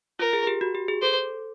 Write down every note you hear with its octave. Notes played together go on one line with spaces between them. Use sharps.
F4 A#4
G#4
G4
F#4
G4
G#4
A4 C5